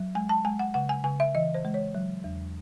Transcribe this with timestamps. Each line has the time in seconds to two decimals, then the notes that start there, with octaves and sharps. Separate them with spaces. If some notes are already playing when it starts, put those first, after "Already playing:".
Already playing: F#3
0.15 G#3 G#5
0.29 A5
0.45 G#3 G#5
0.59 F#5
0.74 C#3 F#5
0.89 G#5
1.04 C#3 G#5
1.20 E5
1.35 E3 D#5
1.54 C5
1.65 G#3
1.74 C#5
1.95 F#3
2.24 E2